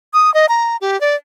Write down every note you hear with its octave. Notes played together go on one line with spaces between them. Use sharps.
D#6
D#5
A#5
G4
D5